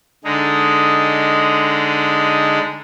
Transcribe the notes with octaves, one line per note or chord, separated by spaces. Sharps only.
D3 G#3 D#4